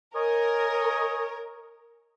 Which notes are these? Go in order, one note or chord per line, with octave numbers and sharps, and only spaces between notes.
A#4 C#5 D#5 G#5